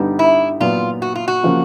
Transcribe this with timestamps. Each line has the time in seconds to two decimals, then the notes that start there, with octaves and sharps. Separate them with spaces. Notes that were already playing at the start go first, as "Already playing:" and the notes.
Already playing: G2 D3 G3 B3 D#4
0.19 E4
0.60 A#2 F#3 B3 F4
1.02 F#4
1.15 F4
1.28 F#4
1.43 C#3 F3 A#3